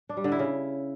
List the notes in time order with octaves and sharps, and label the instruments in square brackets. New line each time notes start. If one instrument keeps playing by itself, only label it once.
[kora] D4
G3
D3
E4
C#3